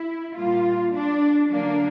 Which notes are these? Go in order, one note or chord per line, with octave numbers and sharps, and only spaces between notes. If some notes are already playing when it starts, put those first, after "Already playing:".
Already playing: E4
A#2 G3 A#3 F4
D4
D3 F#3 A#3 D4